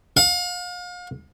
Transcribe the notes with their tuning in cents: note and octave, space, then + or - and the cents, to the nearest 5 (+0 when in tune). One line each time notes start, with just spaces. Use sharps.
F5 +40